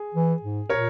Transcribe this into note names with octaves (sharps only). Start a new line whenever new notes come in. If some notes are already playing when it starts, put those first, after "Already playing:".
Already playing: G#4
E3
G#2
A#2 A#4 C#5